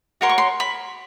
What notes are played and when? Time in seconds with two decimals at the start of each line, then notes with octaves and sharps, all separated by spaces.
0.21 F#4 A#4 C#5 C6
0.29 C#6
0.38 C6
0.60 B5